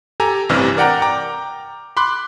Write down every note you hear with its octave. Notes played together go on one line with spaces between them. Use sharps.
G4 A4 G#5 A#5
A1 G2 C3 E3 D5 F6
A#4 D5 F#5 G5 A#5
G5 A#5 D6
B5 C6 D6 F#6